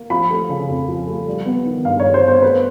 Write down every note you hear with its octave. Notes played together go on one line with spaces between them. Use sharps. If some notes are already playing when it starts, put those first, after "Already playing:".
Already playing: A#3
F3 B5
A3
C#3
F2
F3
A3
G3
B3
D#3
G2 F5
G3 C#5
C5
B3
C5
A3 B4